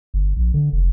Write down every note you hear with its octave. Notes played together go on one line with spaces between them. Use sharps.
G1
A#1
D3
F1